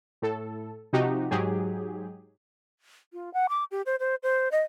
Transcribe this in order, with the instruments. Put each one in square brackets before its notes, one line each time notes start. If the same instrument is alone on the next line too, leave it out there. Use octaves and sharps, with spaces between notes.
[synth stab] A2 A4
C3 F3 D#4 F#4 G4
G#2 F#3 G4 G#4
[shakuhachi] F4
F#5
D6
G4
C5
C5
C5
D#5